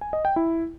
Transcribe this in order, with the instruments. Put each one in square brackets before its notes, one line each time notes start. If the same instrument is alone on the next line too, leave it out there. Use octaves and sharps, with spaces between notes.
[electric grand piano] G#5
D#5
G5
E4